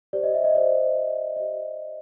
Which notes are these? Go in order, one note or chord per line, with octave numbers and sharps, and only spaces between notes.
G4 C5 D5
D#5
E5
D#5
G4 C5 D5
G4 C5
G4 C5 D#5